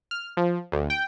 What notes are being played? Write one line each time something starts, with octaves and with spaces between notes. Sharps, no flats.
F6
F3
D2
G5